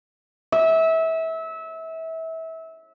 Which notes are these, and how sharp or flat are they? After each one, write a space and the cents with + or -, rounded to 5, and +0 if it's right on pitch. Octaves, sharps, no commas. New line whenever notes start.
E5 -25